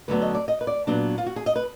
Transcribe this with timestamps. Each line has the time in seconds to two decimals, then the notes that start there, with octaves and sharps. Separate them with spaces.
0.08 D2 D3 F#3 B3 D4 B4
0.21 D#5
0.34 D5
0.48 D#5
0.61 B4
0.67 D5
0.87 A#2 F#3 B3 D4
1.18 F4
1.26 F#4
1.36 G#4
1.46 D#5
1.56 B4